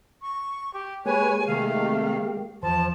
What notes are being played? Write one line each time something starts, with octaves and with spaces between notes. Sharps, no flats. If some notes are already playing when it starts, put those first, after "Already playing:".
C#6
G4
G#3 A#3 G4 B4 C#5 G#5
C3 D#3 A3 F5
E2 F3 C5 A5